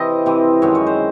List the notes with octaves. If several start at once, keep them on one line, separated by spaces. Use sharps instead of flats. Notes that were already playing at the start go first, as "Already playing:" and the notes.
Already playing: C3 E3 C4 D#5
C3 E3 C4
F#2 D#3 G#3 C4 C#5
C#5
C5